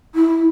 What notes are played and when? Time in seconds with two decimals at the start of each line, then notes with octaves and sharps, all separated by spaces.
0.15 E4